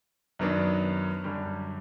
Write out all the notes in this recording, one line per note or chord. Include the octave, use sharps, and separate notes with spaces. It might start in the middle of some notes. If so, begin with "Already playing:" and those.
F#2 D#3 F#3 B3 D4
F#2 D3 G3